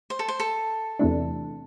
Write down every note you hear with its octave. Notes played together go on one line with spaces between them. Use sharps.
C5
A4
C5
A4
E2 C3 E3 A3 D4